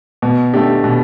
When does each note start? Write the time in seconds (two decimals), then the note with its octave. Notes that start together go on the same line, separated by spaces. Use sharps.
0.22 B2
0.53 A3 D4 G4
0.84 B2